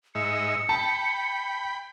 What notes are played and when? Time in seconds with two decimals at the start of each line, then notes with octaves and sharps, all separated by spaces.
0.15 G#2 D#4 E5 C#7
0.69 G5 A5 B5